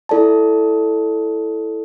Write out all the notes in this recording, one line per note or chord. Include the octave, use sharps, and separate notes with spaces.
E4 A4 D5 A5